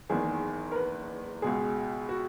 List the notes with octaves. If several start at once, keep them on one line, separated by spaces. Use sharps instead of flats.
F#1 E2 D#3 G#4
A#4
B4
C#2 B2 G#3 G#4
F#4